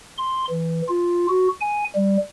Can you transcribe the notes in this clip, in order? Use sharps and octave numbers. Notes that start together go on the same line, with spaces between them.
C6
E3
F4
F#4
G#5
G3